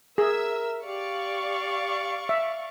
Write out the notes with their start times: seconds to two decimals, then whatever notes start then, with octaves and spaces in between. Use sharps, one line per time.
0.18 G#4 A#4 E5 E6
0.84 G4 D5 F5 C#6
2.29 E5